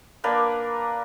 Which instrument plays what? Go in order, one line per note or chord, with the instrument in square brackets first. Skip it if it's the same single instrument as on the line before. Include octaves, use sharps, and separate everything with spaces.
[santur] A#3 D4 A#4 B4